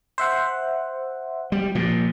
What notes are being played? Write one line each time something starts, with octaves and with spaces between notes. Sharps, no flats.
C5 E5 F#5
G3
A#2 F3